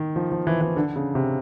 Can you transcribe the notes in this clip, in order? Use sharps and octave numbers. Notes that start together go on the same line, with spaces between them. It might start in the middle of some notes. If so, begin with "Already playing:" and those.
Already playing: D#3
F3
F3
E3
E3
D3
C#3
C3